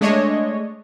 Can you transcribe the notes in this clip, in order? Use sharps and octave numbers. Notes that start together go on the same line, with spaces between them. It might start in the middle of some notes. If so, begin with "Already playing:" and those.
G#3 A3 D4 C#5 D#5